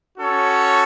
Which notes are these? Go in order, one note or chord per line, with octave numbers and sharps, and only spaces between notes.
C#4 F#4 A4 C#5